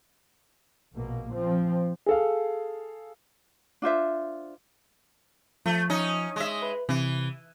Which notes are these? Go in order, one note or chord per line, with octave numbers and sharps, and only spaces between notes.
A#1 B2 A#3
F3 C4
G#4 A4 F5
D4 F4 C5 E5
F3 A3
C#4 D#4
G#3 E5
B4
C3 E3